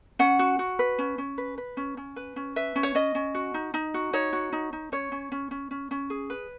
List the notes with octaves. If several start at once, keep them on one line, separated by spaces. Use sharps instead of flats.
C#4 F#5
F#4
F#4
B4
C#4
C#4
B4
B4
C#4
C#4
B4
C#4
B4 E5
C#4
C#5
C#4 D#5
C#4
F#4
D#4
D#4
F#4
D#4 C#5
F#4
D#4
D#4
C#4 C#5
C#4
C#4
C#4
C#4
C#4
G#4
B4